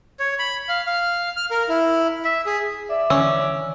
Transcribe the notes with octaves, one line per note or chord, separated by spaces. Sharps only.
C#5
B5
F5
F5
F6
A#4
E4
E5
G#4
D5 E5
D3 E3 C#4 E6